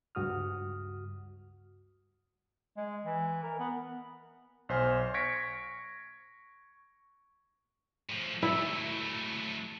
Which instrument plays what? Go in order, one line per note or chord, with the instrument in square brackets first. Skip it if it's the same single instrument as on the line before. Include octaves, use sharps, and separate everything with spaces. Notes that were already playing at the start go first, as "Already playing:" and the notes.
[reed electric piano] C#2 G2 F#4 D#6 F6
[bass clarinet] G#3
E3
A#4
B3
[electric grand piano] B1 C5 G#5 F6
C#6 G#6 A#6 B6 C#7 D7
[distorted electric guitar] A2 F3
[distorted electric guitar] F#3 A3 [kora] E4